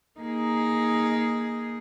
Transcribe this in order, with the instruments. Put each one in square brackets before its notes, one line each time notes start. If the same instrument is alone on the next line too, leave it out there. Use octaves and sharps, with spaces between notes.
[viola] A#3 [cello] D#4 G#4